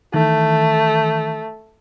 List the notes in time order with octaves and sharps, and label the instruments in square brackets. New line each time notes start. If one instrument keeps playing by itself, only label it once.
[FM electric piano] D#3 E3 [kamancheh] A3